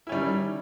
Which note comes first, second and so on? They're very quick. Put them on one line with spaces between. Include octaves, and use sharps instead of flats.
E4 C#4 G3 D#3